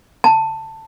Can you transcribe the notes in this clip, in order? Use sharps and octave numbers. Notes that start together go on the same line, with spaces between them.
A5